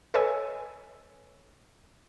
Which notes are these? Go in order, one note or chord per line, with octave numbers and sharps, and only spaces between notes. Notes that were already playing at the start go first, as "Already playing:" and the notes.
A4 B4 C#5 D#5 G#5 E6